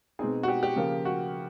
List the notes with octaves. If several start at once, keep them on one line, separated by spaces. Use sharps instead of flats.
B2 G#3 C4 D#4 G#4
F#4
G4
G4
C#3 F3 A#3
F#4